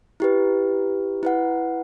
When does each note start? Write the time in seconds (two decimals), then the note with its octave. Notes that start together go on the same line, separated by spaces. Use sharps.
0.20 E4 G4 B4
1.23 E4 B4 F#5